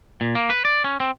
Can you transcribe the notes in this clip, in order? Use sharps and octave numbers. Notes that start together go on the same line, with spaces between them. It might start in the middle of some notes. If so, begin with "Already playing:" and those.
A#2
A#3
B4
D5
C#4
C4